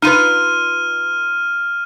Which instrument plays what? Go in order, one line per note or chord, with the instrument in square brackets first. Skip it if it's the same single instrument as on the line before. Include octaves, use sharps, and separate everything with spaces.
[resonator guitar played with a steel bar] D#4 F4 B4 [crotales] F6 D#7